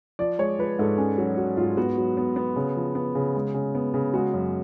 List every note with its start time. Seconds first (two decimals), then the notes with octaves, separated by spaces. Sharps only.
0.19 F3 D5
0.39 G#3 C#5
0.59 F3 B4
0.79 G#2 A4
0.98 C#4 G#4
1.18 F#3 F#4
1.37 F#3 F#4
1.57 G#2 F4
1.77 B3 F#4
1.98 F#3
2.17 B3
2.36 B3
2.56 C#3
2.76 F3
2.95 B3
3.15 C#3
3.35 G#3
3.54 C#3
3.75 B3
3.94 C#3
4.14 G#3 F#4
4.33 F#2